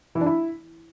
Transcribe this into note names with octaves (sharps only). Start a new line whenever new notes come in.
E3
D4
E4